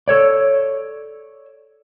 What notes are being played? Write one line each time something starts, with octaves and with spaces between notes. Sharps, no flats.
A4 C#5 D5